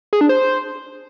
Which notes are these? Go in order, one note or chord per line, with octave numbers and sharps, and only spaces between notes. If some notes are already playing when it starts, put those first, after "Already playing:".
G#4
D4
C5